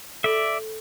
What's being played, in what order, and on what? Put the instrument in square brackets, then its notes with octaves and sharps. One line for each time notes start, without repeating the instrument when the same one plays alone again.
[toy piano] A4 B5 [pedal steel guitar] D5 E5